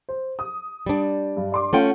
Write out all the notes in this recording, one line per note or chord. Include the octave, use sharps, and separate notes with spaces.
C5
D#6
G3 D4
G2
D5 C6 D6
A3 C#4 F4 F#5 G5